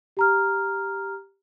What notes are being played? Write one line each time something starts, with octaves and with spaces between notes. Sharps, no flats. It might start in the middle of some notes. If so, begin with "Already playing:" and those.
G4 A#5 F6